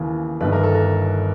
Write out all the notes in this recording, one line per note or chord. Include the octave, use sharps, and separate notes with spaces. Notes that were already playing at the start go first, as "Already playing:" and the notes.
Already playing: D#2 C#3 E3
G1 G2 D#3 B4
A#4
A4
A#4